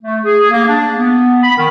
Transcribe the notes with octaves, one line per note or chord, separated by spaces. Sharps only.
A3
G#4
A#3
D4
B3
B5
D#3